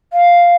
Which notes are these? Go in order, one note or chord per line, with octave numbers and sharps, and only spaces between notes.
F5